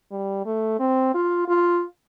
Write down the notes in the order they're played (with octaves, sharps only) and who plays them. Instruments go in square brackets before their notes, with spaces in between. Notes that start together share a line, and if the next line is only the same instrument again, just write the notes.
[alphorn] G3
A3
C4
F4
F4